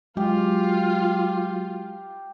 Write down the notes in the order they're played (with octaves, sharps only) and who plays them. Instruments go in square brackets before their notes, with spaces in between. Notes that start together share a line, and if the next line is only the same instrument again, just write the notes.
[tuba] F#3 [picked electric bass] G#3 [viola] F4 [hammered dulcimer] G4